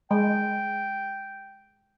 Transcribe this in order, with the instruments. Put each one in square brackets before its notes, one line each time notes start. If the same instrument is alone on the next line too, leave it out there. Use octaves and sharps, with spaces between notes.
[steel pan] G#3 [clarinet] G5